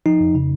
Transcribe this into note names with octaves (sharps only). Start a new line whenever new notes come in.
F3 D#4
F2
C#3